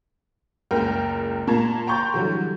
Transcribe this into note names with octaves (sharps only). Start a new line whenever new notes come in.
F#1 C#2 A#4 G5 F6
A#2 A#3 A5 A#5 G#6
G5 A#5 C6 C#6 G6 A6
D3 E3 F#3 G3